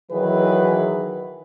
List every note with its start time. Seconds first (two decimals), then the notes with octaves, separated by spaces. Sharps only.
0.12 D#3 E3 F#3 G#4 B4